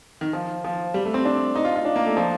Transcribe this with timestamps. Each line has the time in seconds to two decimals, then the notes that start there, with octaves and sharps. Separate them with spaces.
0.21 D#3
0.33 F3
0.64 F3
0.94 G3
1.05 A3
1.14 C4
1.25 D4
1.56 D#4
1.65 F4
1.76 F4
1.85 D4
1.96 A#3
2.06 A3
2.17 F3